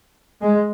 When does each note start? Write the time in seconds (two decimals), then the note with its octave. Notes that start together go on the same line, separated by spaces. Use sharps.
0.41 G#3